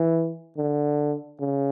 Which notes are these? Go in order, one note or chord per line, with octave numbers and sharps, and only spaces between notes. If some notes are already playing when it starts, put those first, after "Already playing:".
Already playing: E3
D3
C#3